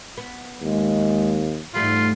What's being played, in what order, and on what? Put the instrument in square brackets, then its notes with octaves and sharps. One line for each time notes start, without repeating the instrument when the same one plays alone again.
[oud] B3
[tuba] D#2 [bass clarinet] G#3
[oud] E2 G3 A3 [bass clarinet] G#2 [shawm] F4